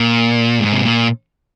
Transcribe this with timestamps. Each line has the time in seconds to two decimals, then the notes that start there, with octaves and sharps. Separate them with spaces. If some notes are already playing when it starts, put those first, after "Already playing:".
Already playing: A#2
0.60 G#2
0.73 C3
0.83 A#2